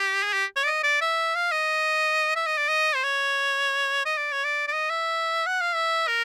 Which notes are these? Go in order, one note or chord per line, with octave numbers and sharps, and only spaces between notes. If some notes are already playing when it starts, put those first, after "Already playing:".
Already playing: G4
G#4
G4
C#5
D5
D#5
D5
E5
F5
D#5
E5
D#5
D5
D#5
C5
C#5
D#5
D5
C#5
D5
D5
D#5
E5
F#5
F5
E5
A#4